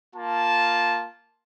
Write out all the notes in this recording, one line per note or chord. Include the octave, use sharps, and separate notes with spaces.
A#3 F4 A5